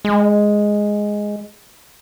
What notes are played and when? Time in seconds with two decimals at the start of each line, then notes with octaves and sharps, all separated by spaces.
0.05 G#3